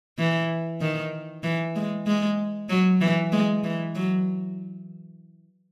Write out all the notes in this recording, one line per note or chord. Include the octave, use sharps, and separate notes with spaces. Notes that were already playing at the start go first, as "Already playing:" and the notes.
E3
D#3
E3
G#3
G#3
F#3
E3
G#3
E3
F#3